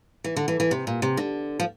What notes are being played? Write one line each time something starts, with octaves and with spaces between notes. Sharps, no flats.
E3
D3
E3
E3
C3
A#2
C3
D3
F3